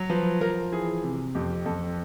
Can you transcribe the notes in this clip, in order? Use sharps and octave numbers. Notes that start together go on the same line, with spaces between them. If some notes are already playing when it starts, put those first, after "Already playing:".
Already playing: F#3
F3 B4
F3 A#4
E3 G#4
C3
F2 G4
F2 A4